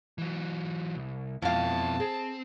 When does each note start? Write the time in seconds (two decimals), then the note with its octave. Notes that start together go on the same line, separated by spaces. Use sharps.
0.18 E3 F#3
0.95 C2
1.42 F2 B2 E4 F5 A5
2.00 C4 G#4